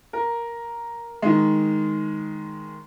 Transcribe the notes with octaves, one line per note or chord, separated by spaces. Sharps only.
A#4
D#3 G#3